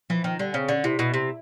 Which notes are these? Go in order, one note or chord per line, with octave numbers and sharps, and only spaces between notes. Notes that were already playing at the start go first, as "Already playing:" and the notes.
E3 F3
D#3 F3
D3 G3
C#3 C4
D3 C#4
C3 E4
B2 E4
C3